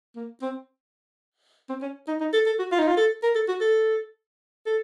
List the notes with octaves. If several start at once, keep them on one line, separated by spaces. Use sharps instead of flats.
A#3
C4
C4
C#4
D#4
D#4
A4
A4
F#4
F4
D#4
F4
A4
A#4
A4
F#4
A4
A4